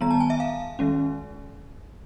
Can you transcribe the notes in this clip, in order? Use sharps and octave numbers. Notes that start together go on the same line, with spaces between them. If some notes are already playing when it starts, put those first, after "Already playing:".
D#3 G3 B3 A#5
A5
G#5
E5
F5
D#3 G#3 C#4